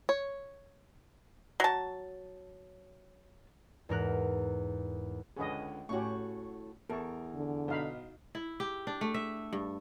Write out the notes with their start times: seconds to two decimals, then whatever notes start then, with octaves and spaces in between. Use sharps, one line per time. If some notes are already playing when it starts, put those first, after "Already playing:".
0.09 C#5
1.60 F#3 A5
3.89 E2 G#2 A#4 F#6
5.36 C#2 D3 C#4 G#4 B4 D#5
5.89 A2 A3 C#4 F#4 G4 C#6
6.90 E2 A4 A#4 C#6
7.35 D3
7.68 B1 D#4 F5 B5
8.35 E4
8.60 G4
8.87 D4
9.01 A3
9.14 E5
9.53 G2